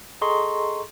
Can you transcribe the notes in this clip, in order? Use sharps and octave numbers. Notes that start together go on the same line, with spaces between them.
G#4 A4 D#5 A#5 C6 C#6